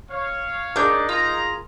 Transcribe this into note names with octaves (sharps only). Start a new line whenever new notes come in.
C#5 F5
D4 D#4 G#4 A#4 G6
A#3 F4 F5 A#5